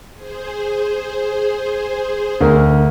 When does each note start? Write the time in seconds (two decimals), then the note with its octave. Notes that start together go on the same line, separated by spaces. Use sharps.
0.14 G#4 C5
2.41 D2 A#4